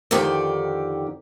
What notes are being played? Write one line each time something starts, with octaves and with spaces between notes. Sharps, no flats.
F2 D3 D#3 G4 D5